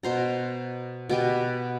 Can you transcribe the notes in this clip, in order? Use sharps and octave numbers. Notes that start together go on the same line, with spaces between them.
B2 C5 A#5
B2 B3 G4 G#5